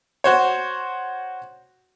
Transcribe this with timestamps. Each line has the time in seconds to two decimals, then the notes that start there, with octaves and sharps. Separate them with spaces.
0.24 F#4 C5 C#5